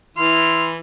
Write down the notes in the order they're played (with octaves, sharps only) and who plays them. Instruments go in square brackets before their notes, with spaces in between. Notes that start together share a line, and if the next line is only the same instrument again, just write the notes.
[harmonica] E3 [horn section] E4 [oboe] C6 [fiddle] F6